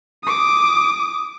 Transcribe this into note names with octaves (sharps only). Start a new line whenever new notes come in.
D6 D#6